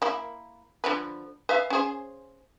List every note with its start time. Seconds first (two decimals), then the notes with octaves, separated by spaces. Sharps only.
0.02 A#3 E4
0.84 D3 F3 B4
1.49 B4 E5 F5
1.70 C#4 G#4 C5